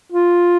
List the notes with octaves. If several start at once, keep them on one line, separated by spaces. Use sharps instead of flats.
F4